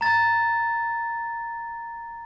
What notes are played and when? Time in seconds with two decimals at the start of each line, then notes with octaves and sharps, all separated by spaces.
0.01 A#5 A6